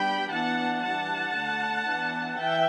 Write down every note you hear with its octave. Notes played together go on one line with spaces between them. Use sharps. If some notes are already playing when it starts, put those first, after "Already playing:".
Already playing: G3 B3 D4 G5 B5
E3 B3 D4 F#5 A5
E3 G3 D4 F#5 A5
D3 A3 D4
E3 B3 D4
E3 E5 G5